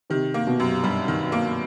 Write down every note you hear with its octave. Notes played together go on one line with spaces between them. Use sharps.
C3 D#3
A#3
B2
F#2
G2 G3
D#3
A#3